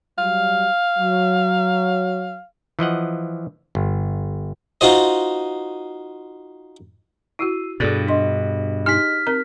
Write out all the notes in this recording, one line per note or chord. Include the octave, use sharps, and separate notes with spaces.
F#3 G3 F5
F#3
E3 F3 D#5 F#5
G1
D#4 F4 F#4 C5 D#5
E4 F#4 E6 C7 D#7
G2 B2 G#4 A4 D5 A6
D4 G#4 D#5 C6
D#4 G4 G#5 F6 B6
C4 A#4 A#5